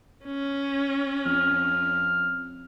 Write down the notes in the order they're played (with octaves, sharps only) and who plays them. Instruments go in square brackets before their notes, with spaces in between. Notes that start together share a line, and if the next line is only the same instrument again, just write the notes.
[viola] C#4
[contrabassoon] F2 [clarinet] F6